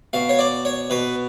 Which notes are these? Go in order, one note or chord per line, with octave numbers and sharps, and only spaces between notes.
B2 F5
C#5
D5
C#5
B2 B4